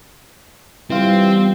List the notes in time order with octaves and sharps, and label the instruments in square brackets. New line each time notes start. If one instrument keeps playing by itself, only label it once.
[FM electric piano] E3 F4 [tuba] G3 [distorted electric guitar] C4